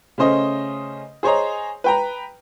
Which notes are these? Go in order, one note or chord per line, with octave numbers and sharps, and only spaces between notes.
C#3 A3 C#4 C5 D#5
G#4 C5 C#5 D#5 A#5
B4 G5 A#5